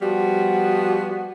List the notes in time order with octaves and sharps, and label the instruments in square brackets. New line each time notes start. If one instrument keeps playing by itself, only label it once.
[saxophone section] F3 G3 B3 F#4